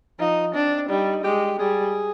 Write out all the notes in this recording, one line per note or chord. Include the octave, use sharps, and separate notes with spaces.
F3 D#4
C4 D4
G3 D#4
G#3 G4
G3 G#4